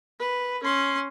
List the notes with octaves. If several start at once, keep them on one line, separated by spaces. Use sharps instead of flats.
B4
C#4 C6